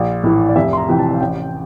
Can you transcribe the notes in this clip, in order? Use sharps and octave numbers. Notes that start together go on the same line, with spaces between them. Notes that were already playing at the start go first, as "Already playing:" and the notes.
Already playing: A#1
A2 E3
D5
F1 E5
C6
A#5
F2 C3 E3 G5
A5
F5
A1 G5